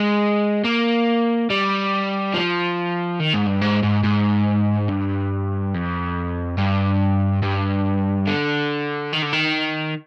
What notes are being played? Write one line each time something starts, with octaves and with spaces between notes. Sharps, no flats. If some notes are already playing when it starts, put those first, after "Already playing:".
Already playing: G#3
A#3
G3
F3
D#3
G#2
G2
G#2
G#2
G#2
G2
F2
G2
G2
D3
D#3
D3
D#3